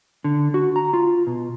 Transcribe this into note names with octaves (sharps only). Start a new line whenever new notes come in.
D3
F#4
A#5
F4
B2